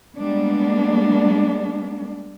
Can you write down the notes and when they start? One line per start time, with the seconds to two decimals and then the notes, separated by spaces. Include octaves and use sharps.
0.15 G3 G#3 A#3 B3 D4